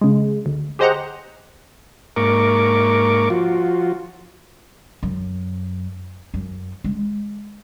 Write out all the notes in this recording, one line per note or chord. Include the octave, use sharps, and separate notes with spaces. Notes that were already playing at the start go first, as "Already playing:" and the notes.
C#3 G#3
D2
G4 G#4 C5 D#5 F#5 A#5
G#2 A#3 A#4 C#6 D6
F3 F4 F#4
F#2
F#2
G#3